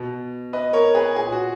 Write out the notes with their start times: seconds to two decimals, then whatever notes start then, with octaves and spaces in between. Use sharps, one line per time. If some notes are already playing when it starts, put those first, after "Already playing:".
Already playing: B2
0.53 B4 D#5
0.73 A#4 C#5
0.95 G#4 B4
1.16 A#2 G#4
1.32 F#4